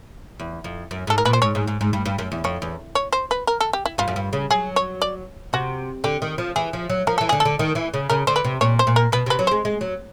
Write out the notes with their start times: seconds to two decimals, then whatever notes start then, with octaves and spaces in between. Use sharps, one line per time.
0.40 E2
0.64 F2
0.91 F#2
1.07 G#2 A4
1.18 A#4
1.25 A#2 B4
1.33 C5
1.42 G#2 C#5
1.55 G#2
1.67 G#2
1.81 G#2
1.93 G2
2.06 G2
2.18 F#2
2.32 E2
2.44 F2 C#5
2.62 E2
2.95 C#5
3.13 C5
3.31 B4
3.47 A#4
3.60 A4
3.73 G4
3.86 E4
3.98 G2 F4
4.08 F#2
4.16 G2
4.33 C#3
4.50 F#3 G#4
4.76 C#5
5.02 D5
5.53 C3 F#4
6.04 D3 G4
6.22 D#3
6.38 F3
6.56 E3 G#4
6.73 F3
6.90 F#3
7.07 F3 A#4
7.18 E3 A4
7.29 D3 G#4
7.40 A4
7.45 D3
7.59 D#3
7.75 E3
7.94 C#3
8.10 C#3 A#4
8.27 D3 C5
8.36 B4
8.45 C3
8.61 A#2 C#5
8.79 C5
8.87 A#2
8.96 A#4
9.12 B2 B4
9.26 C3 B4
9.39 F#3
9.47 G#3 C5
9.65 G#3
9.81 F#3